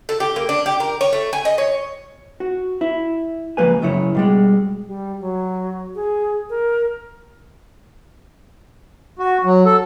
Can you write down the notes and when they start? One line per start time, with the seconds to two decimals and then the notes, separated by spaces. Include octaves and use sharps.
0.09 A4
0.20 G4
0.36 A#3
0.49 D4
0.66 G4
0.80 A#4
1.01 C#5
1.13 A3
1.33 G#5
1.45 D#5
1.58 C#5
2.40 F#4
2.81 E4
3.57 C#2 G#2 F3 A#3 B4 G#5
3.82 F#2 C#3 E4 C#5
4.15 B2 G3 G#3
4.87 G3
5.21 F#3
5.95 G#4
6.50 A#4
9.19 F#4
9.44 F#3
9.66 A4